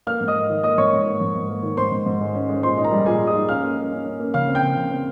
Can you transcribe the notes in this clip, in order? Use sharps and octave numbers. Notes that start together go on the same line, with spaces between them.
A#3 F5 F6
G#2
D#5 D#6
A#3
D#3
A#3 D#5 D#6
G#2 C#5 C#6
G#2
A#3
G#2
G#2
A#3
D#3
G#2 C5 C6
G#2
G#2
G#3
C#4
G#3
A#2 C5 C6
D#4
A#4 A#5
G3
A#2 G#4 G#5
A#2
D#5 D#6
D#4
C#4 F5 F6
A#3
A#3
C#4
C#4
A#3
C#3 F5 F6
C4
G5 G6
C#3
C#3
C4